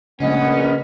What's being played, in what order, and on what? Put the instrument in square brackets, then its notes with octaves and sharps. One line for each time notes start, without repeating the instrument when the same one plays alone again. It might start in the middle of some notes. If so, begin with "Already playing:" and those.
[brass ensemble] A#1 B3 [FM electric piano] C#3 G#3 A3 [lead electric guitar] C#4 [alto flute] D#5